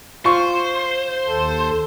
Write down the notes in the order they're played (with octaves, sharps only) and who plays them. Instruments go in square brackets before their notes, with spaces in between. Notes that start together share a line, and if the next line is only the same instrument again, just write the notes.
[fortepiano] F4 C#6 [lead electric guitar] C5
[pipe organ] D#2 A4